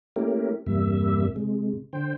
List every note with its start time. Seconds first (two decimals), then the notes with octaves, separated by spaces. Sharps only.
0.16 A3 A#3 C#4 E4 G4 A#4
0.66 E2 G2 C3 G3 A#3 E5
1.36 C3 G#3
1.93 D3 C5 G5